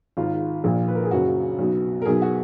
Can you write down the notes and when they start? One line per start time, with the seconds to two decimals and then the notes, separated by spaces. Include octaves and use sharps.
0.17 G#1 G#2 D#3 F4
0.64 A#1 A#2
0.88 B4
0.95 A#4
1.04 G#4
1.11 F#1 F#2 C#3 F#4
1.58 B1 B2
2.02 A#4
2.05 B1 B2 G#4
2.22 F#4